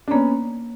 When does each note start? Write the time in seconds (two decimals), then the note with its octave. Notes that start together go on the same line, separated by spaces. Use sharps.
0.08 D4
0.11 A#3 B3 C#4